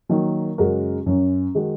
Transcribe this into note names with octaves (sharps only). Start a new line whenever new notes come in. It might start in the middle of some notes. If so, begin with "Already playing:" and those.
D#3 F#3 A#3
F#2 C#3 G#3 F#4 A#4
F#2 F#3 C#4
D#3 G#3 D#4 F#4